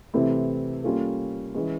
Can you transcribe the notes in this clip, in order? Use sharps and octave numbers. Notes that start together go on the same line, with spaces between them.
C3 E3 A3 C4 E4
G3 A#3 C#4 F4 A4
E3 G#3 C#4